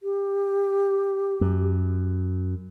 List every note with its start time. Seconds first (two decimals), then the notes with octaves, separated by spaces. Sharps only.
0.03 G4
1.41 F#2